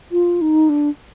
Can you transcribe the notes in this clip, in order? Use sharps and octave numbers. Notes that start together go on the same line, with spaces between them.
F4
D#4
D4